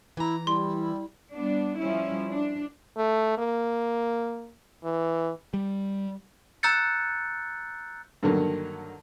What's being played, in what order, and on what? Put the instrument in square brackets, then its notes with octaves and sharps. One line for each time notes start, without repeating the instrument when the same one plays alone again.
[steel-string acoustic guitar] E3 A#5 [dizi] E4
[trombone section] G3 [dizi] E4 [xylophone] C6
[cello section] G3 B3 D4
F3 G3 C#4 E4
D4
[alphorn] A3
A#3
E3
[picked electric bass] G3
[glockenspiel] A#5 E6 F#6 G6 A6 C#7
[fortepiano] G2 D3 D#3 F#3 A#3